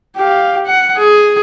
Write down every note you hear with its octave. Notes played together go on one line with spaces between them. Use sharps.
G4 F5
F#5
G#4